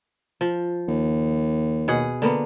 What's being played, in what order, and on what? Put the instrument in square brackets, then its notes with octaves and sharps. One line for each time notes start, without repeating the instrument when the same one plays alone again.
[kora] F3
[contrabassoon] D#2
[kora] B2 G#4 F#5
D3 A#3 B3